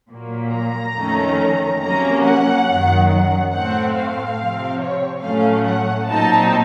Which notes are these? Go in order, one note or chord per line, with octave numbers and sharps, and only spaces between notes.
A#2 F#3 A#3
A#5
F2 D#3 A3 C#4
C3 F#3 A#3 C#4 A#5
F#5
F#2 D#3 F#3
F#5
A2 A3 C4 F#5
F5
C3 F3 C4
C#5
A2 F#3 A3 C#4 F5
F#5
A#2 F#3 C4 D#4 A5